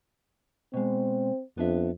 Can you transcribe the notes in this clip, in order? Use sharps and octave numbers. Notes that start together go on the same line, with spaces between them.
B2 G#3 C4
F2 B3 D4 E5